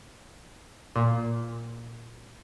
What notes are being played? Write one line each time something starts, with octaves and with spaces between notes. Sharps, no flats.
A#2